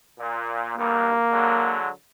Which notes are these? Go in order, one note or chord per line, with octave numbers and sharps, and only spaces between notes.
A#2
B1 G2 A#3
D3 F#3 G#3